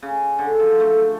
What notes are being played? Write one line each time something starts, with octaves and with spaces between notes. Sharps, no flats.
C#3
D3
F3
A3